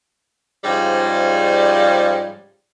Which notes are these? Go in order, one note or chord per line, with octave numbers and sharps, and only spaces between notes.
G#2 C#3 F3 G3